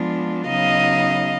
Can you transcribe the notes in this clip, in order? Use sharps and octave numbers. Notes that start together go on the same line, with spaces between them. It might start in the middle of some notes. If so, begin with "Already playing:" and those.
Already playing: F3 G#3 B3 D4 F4
C#3 F#3 B3 D#4 D#5 F5